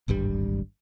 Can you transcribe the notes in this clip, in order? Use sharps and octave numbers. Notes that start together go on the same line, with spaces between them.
D1 G#1 G2 G3